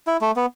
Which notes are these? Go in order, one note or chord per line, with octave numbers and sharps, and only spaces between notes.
E4
A3
B3